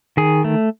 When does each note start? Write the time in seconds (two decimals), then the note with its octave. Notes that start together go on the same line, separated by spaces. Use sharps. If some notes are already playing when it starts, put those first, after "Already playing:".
0.17 D#3 G#4
0.44 A3